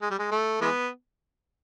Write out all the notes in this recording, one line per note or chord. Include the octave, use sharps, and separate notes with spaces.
G#3
G3
G#3
A3
E3 G#3 B3